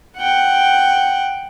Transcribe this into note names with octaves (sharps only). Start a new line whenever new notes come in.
F#5 G5